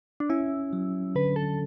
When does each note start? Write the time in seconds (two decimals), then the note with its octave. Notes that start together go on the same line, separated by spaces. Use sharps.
0.20 D4
0.29 C#4 E4
0.73 F#3
1.15 D3 B4
1.36 A4